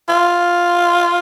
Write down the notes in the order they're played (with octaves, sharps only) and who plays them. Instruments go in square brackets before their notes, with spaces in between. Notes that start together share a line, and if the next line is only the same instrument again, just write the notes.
[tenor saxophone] F4